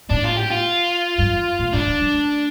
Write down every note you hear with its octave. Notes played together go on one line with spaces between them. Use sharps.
A2 D4
F4
G4
F4
G2
F2
A2
A2 D4
D3
G3
A3